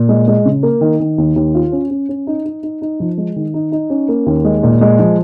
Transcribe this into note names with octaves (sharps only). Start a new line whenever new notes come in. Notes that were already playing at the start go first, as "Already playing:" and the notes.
Already playing: A#2
G#3
G#3
C#3
A#3
D#3
D#3
D#2
D#2
F4
C#4
C#4
C#4
D#4
D#4
D#4
D#4
F3
G#3
D#3
D#4
D#4
C#4
A#3
D#2
G#3
A#2
G#3
F3